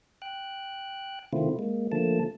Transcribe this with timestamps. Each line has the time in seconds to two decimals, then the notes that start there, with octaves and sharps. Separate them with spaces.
0.22 G5 F#6
1.33 C3 D#3 A3 C4 E4 F4
1.59 G#3 A#3
1.92 D3 F3 A3 A#3 A5